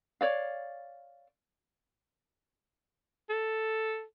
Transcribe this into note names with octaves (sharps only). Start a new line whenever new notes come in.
C#5 D5 F5
A4